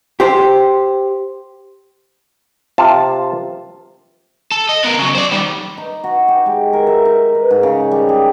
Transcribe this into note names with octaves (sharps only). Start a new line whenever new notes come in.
G4 C5
C3 F4 A5
A4
D#5
B3 A#4
C#3 F#3
C5 D5
D#3 G3
D#4
F#4
G4
G#3
A#4
E5
D#4
B4
G#2
C#3
G3
G#4